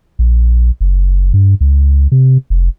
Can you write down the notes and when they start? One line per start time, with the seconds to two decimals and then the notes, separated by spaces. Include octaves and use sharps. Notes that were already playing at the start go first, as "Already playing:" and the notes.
0.19 A#1
0.80 F#1
1.34 G2
1.61 C#2
2.12 C3
2.50 F1